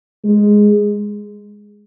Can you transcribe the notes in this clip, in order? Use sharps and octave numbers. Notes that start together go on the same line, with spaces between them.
G#3